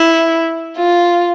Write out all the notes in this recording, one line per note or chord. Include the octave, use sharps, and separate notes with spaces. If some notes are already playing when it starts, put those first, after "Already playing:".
Already playing: E4
F4